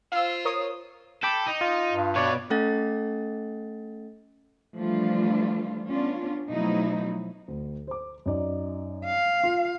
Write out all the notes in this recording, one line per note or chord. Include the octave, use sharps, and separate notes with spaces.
F4 C5 F5 E6
A#4 C#5 D#6
A4 G5 B5 D6
D#4
F4
G2
B2 B4 C#5 D5
A3 C#4 A4 F#5 A6
E3 F3 G3 A3 D4 F4
B3 C#4 D4 F4
B2 F3 F#3 A3 D#4 E4
D2
C5 D6
F#2 D#4 D5
F5
F4